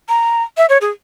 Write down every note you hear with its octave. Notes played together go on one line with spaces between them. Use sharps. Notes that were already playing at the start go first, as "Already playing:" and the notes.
A#5
E5
C#5
G#4